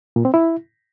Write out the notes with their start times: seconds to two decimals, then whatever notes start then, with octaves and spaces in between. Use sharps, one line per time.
0.16 A#2
0.25 C4
0.34 E4